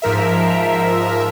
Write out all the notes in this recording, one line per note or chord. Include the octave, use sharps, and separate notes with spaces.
G#2 F3 A#4 E5